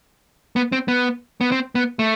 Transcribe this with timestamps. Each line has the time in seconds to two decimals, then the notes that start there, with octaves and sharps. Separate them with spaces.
0.56 B3
0.72 C4
0.88 B3
1.41 B3
1.52 C4
1.75 B3
1.99 A3